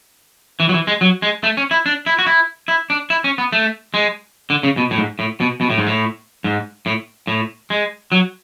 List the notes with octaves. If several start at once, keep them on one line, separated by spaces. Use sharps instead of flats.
E3
F#3
E3
G#3
F#3
G#3
A3
C#4
E4
D4
E4
F#4
E4
E4
D4
E4
C#4
B3
A3
G#3
D3
C#3
B2
A2
G#2
A2
B2
B2
A2
G#2
A2
G#2
A2
A2
G#3
F#3